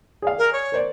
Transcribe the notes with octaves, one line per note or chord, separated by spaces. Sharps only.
G#4 D5 F5
A#4
C#5
A#4 C5 D5